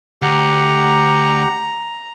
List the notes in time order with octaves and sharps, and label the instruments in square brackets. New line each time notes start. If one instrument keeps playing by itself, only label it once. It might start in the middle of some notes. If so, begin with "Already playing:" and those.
[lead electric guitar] D2 [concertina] G4 F#5 [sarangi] A#5